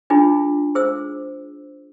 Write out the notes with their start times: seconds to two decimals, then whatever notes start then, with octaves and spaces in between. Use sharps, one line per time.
0.10 D4 D#4 F4 G#4
0.75 G#4 C5 E6